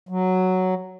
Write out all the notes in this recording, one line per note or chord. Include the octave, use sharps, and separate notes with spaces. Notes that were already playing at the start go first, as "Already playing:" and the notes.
F#3